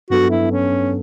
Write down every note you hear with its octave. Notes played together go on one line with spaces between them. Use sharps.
G2 F#3 B3 D4 F#4 A4
E4
C#4